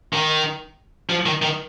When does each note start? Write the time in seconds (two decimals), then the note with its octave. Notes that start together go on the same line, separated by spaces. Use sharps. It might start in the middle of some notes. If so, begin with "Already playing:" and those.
0.13 D#3
1.10 F3
1.26 D#3
1.42 D#3